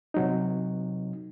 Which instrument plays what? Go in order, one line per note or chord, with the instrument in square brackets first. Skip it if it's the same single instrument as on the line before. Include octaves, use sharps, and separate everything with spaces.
[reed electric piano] C3 F#3 D#4